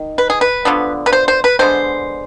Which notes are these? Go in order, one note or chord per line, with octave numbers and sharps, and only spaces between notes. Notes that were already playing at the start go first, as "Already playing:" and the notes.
Already playing: D#3
B4
G#4
B4
D3 F3 B3
B4
C5
C5
B4
D3 G#3 B3 C5